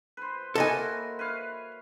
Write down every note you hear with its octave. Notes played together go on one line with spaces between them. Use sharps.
B4 C5
A#3 E4 F#4 A4 D#5 G#5
B4 C#5 F5